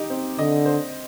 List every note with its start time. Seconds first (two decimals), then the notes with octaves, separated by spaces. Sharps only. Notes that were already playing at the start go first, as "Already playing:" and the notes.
Already playing: D#4 G4
0.10 C4
0.38 D3 D#5
0.65 C5